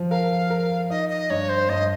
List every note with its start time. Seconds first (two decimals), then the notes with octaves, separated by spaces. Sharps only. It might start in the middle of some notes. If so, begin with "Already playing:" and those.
Already playing: F3
0.11 A#4 F5
0.50 A#4
0.90 D#4 D#5
1.10 D#5
1.30 G2 C#5
1.49 C5
1.69 G2 D#5